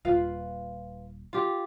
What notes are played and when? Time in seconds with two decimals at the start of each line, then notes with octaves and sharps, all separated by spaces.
0.05 D#1 F4 B4 F5
1.33 F4 G4